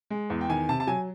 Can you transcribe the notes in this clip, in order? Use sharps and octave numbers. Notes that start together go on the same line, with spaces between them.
G#3
E2
G5
D#3 G#5
C3 A5
A5
F#3 G#5